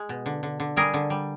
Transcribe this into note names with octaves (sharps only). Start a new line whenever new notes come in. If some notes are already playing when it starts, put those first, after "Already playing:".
Already playing: G#3
B2
D3
D3
D3
G3 G#4 A#4
D3
G3